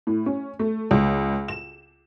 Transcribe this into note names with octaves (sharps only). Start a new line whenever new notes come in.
A2
C#4
A3
C#2
E7